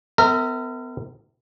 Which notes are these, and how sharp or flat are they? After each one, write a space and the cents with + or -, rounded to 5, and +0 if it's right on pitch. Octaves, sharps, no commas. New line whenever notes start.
B3 +35 A#4 -35 E5 -25